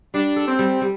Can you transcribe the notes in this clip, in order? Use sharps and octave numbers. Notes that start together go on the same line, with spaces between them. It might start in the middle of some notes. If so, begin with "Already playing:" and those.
G3 D4
A4
C4
G3
G3